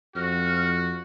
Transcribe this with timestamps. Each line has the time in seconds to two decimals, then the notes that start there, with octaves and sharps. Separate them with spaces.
0.16 F2 F#4 F6